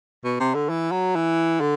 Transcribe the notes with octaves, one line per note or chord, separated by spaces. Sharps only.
B2
C3
D3
E3
F#3
E3
D3